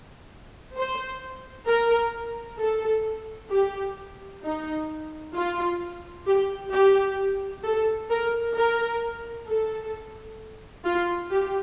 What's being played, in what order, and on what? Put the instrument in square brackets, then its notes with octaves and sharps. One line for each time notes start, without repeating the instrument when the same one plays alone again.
[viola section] C5
A#4
A4
G4
D#4
F4
G4
G4
A4
A#4
A#4
A4
F4
G4